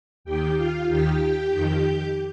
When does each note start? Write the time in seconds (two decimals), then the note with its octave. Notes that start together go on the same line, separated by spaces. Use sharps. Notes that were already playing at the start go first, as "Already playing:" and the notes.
0.24 D#2 D#3 G4 G5
0.57 F4 F5
0.88 D#2 D#3 G4 G5
1.53 F2 D#3